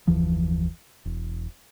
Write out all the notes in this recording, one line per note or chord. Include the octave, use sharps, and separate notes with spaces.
F#1 D#2 E3 F3
E1